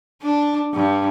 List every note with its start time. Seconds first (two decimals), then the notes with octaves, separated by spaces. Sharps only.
0.22 D4
0.74 G2